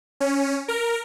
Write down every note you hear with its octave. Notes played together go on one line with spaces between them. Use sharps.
C#4
A#4